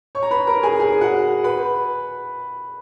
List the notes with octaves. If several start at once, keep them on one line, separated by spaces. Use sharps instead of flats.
C#5 C#6
A#5
B4 B5
A#4 A#5
G#4 G#5
G#4 G#5
F#4 F#5
B4 B5